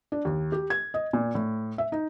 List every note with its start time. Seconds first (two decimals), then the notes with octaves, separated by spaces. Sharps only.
0.12 D4
0.25 D#2
0.52 G4
0.70 G#6
0.94 D#5
1.13 A#2
1.35 A2
1.78 E5
1.92 D#4